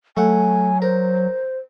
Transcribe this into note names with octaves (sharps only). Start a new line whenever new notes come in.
F#3 A3 F#5 G#5
A#4 C5